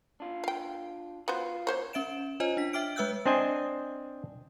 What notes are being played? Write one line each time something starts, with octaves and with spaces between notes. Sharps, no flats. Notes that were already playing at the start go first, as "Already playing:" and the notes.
D4 F4
F5 G5
B3 F4 F#4 C5
A#3 C5 C#5
C#4 E5 D7 E7
F4 C5 C#5 D#5 G#5
D4 B6
E5 G5 D6 F6 D7
G#3 B4 E5 E6 F#6 G6
C4 D4 C5 D#5 G#5